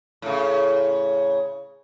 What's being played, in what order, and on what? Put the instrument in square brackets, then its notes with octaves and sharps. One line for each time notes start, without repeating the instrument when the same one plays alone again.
[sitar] A2 C#3